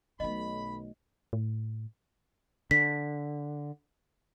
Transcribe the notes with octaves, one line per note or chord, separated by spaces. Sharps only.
B1 D#3 A3 D#5 B5
A2
D3 B6